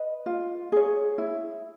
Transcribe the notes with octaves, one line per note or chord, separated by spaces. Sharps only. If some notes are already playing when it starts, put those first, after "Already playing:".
Already playing: B4 D#5
F4
G#4 C#5
E4